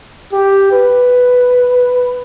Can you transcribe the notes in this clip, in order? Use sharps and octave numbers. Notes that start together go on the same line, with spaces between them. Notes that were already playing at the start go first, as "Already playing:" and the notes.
G4
B4